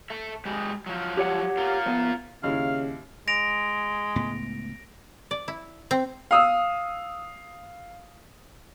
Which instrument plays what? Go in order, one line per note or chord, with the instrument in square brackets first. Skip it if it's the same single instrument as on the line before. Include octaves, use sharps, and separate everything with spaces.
[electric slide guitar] A4 E5
G#3 G4
F3 F#3
[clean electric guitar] G4 C#5 F#5
[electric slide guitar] F4 A#4
[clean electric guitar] F3 B3
[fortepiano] D#2 E4 [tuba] C#3 [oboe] F5
[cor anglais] G#3 [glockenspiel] A#6 D7 F7
[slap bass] C#2 A2 B3
[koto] D5
E4
C4
[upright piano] F5 D#6 E6